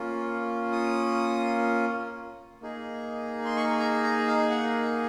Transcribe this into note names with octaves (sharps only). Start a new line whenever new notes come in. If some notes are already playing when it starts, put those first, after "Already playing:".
Already playing: A#3 C#4 F4
D#6
A#3 D#4 G#4
C6
C#6
A#5
A#5
F5
F#5